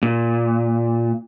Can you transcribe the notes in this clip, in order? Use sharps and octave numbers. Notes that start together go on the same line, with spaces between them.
A#2